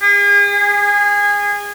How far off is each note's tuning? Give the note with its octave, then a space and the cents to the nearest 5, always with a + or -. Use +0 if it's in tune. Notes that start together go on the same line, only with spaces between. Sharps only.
G#4 -40
G#4 -25